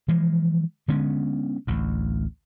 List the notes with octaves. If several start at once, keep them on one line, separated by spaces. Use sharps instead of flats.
E3 F3 G#3
D3 G#3 B3 C#4
A1 D2